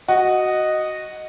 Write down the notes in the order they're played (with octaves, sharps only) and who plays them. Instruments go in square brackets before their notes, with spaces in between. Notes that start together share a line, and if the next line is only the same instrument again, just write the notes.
[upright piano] F#4 [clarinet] D#5